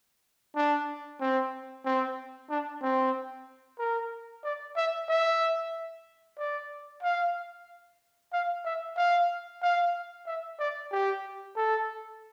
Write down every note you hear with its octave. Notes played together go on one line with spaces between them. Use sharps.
D4
C4
C4
D4
C4
A#4
D5
E5
E5
D5
F5
F5
E5
F5
F5
E5
D5
G4
A4